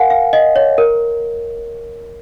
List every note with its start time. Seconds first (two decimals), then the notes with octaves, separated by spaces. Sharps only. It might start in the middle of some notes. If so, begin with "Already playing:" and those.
Already playing: A#4 F5 F#5 G#5
0.10 F5
0.33 D#5
0.56 C#5
0.78 A#4